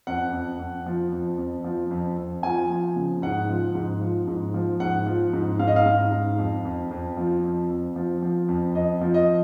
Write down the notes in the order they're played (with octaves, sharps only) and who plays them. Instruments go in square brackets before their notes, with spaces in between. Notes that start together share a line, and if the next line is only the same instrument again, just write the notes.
[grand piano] F2 F#5
F2
F2
F3
F2
F2
F3
F2
F2
F3 G#5
F3
C#3
G#2 F#5
F3
G#2
F3
G#2
F3
G#2 F#5
F3
G#2
G#2 F5
D#5
F5
G#2
G#2
F2
F2
F2
F3
F2
F2
F3
F3
F2
F2 D#5
F3
D#5